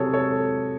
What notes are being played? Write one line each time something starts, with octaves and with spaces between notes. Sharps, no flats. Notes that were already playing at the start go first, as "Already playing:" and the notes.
Already playing: C3 F#3 G#4 A4 C#5
A4 C#5